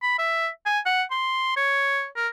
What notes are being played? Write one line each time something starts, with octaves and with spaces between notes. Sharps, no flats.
B5
E5
G#5
F#5
C6
C#5
A#4